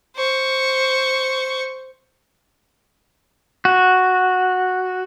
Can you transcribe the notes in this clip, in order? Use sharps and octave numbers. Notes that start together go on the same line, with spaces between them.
C5 C#6
F#4